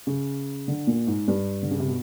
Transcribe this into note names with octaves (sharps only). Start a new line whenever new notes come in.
C#3
D3
A#2
G#2
G2
D3
C#3
C3
B2